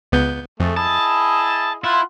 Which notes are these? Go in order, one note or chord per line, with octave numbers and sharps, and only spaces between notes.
C#2 B3 G6
F2 A3 G#4
E4 G#4 D#5 A5
E4 F4 F#5 C6